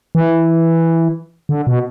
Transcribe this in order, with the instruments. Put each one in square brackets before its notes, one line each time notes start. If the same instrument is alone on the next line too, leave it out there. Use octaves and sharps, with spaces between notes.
[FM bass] E3
D3
B2